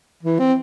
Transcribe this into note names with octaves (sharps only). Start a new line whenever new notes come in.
E3
C4